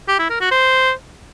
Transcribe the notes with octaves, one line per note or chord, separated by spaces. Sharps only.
G4
E4
A#4
F#4
C5